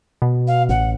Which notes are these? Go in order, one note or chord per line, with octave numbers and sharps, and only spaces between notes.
B2
F5
A1 F#5